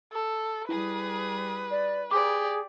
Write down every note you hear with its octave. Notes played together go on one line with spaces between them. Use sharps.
A4
G3 E4 G#4 B4 D#6
D5
G4 G#4 D5 D6